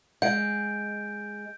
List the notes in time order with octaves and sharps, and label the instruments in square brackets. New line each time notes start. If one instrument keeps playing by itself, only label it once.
[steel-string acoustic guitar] G#3 [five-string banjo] F#5 [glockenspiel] G6 D7